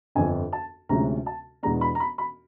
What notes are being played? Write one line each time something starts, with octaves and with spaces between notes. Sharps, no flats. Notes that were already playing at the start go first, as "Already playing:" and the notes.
G1 F2 D3 G#5
A5
D2 C3 F3 G#3 C#4 A#5
A5
E2 B2 G#3 B3 D4 A#5
B5
A#5
B5
B5